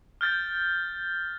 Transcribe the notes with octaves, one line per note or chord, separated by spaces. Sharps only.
F6 G6 A6